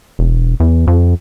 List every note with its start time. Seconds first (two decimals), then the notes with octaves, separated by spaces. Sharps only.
0.19 E1
0.60 E2
0.87 F2